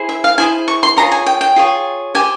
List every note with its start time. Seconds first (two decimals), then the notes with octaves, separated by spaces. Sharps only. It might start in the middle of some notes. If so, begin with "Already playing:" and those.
Already playing: E4 G#4 C5
0.09 E5
0.24 F5
0.38 E4 G#4 C5 G#5
0.68 C#6
0.83 C6
0.97 F4 G#4 C#5 A#5
1.12 G#5
1.26 G5
1.41 G5
1.56 F4 G#4 C#5
2.15 G4 C5 G#5